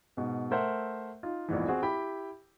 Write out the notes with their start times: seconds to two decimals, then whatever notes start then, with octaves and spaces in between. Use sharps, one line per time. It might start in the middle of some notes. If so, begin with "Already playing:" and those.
0.17 G#2 B2
0.51 A3 A#4 C5 E5 F#5
1.23 D#4 F4
1.48 A#1 E2 G#2 E3
1.68 C4 F#4 G#4
1.83 E4 G4 G5 B5